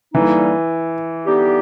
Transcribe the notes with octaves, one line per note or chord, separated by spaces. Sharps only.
D3 E3 G3 A#3 D#4
D3 G3 B3 D#4 G4